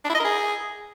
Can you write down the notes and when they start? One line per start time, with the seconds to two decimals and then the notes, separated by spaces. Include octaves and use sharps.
0.05 D4
0.10 E4
0.15 D#5
0.20 A#4
0.25 G#4